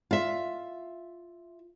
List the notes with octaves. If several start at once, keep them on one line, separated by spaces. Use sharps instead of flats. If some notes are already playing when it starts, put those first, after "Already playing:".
F4 E5